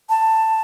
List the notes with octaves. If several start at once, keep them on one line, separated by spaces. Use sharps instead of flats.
A5